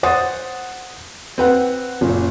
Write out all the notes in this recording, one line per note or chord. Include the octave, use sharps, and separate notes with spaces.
C5 F#5 D#6 A6
C4 B4 F#5
F#1 A#2